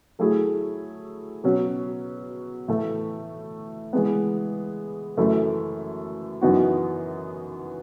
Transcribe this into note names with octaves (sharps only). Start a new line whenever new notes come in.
F#3 A3 E4 G#4
B2 F#3 C#4
A2 E3 A3
E3 G#3 B3
F#2 E3 A3 E4 A4
F#2 E3 B3 D#4 F#4